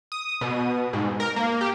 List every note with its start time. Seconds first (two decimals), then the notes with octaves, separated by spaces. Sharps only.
0.12 D#6
0.41 B2
0.93 G#2
1.20 A#4
1.36 A#3
1.61 G4